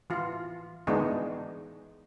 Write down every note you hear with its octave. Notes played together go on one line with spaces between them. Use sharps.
E3 F4
D#3 E3 G#3 B3 D4 D#4